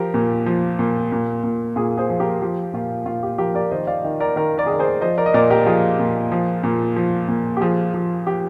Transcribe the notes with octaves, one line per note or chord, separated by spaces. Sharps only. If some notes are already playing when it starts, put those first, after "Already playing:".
Already playing: F3 G4 A#4
A#2
F3
A#2
A#2
A#2
A#2 F4 G#4
G#4 C5
F3
G4 A#4
F3 G4
A#2 F4
A#2 F4
G4
F3 G4 A#4
A#4 D5
D#3 C5 D#5
D5 F5
D#3
A#4 D5
D#3 A#4 D5
A#4 D5
G#4
D#3 A#4
G#4 C5
F3 C5 D#5
A#4 D5
D#5
A#2 A#4 D5
G4 A#4
F3 F4 G#4
A#2
F3
A#2
F3
A#2
G4
F3 F4 G#4
F3
F3 G4